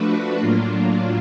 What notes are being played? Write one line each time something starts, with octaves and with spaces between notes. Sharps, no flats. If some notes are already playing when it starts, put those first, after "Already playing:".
Already playing: F3 A3 D4 F#4 B4
A2 F#3 A#3 D4 F4